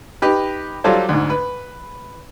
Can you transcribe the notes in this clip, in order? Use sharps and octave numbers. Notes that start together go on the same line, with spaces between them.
D#4 G4 B4
F#3 G3 F4 A4 C5
D2 G#2
B4